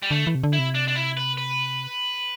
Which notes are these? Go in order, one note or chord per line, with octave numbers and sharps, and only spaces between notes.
G3
D3 A3
E3
C3
D3
E4
C3
D4
D4
E4
B4
B4